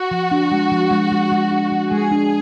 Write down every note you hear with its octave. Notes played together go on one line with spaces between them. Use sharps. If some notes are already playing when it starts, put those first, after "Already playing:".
Already playing: F#4
F3
D4
G#3
F3
G#3
G#3
G#3
D4
F3
G#3 G#4
D4